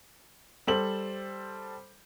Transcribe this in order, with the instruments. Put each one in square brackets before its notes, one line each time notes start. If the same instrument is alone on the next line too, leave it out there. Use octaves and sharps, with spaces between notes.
[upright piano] G3 A4 C5 F#7